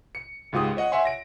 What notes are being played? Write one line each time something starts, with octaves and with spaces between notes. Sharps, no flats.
C#7
C#2 G#2 F4 G4 D#6
C#5 D#5 F#5
C#5 E5 F#5 G#5 C6
A#6 D7